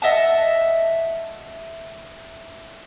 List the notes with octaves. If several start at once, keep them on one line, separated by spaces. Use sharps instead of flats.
D#5 E5 F#5 A5